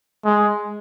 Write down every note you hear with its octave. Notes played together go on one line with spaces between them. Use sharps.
G#3